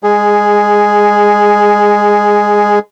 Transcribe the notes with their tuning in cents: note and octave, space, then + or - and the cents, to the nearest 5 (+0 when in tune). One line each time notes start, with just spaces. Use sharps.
G#3 -20 G#4 +0